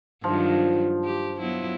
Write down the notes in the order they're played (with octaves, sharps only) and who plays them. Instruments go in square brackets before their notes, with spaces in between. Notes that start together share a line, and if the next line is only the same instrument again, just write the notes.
[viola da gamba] G2 D#3 F#3 [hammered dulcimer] F3
[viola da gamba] G4
F#3 B3 E4